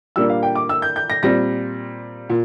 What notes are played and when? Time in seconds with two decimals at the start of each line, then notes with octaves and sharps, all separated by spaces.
0.16 A#2 G3 A#3 D4 E6
0.29 F5
0.43 G5
0.55 D6
0.69 E6
0.82 G6
0.96 G6
1.10 A#6
1.23 A#2 G3 C4 A#6
2.30 A#2